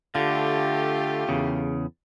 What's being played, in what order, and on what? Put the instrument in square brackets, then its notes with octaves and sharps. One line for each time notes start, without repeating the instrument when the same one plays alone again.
[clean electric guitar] D3 [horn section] A3 F4 G4
[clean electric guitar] E2 C#3